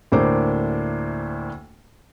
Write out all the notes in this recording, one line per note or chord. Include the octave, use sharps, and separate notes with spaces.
D2 A2 A#3 D4 C5 D6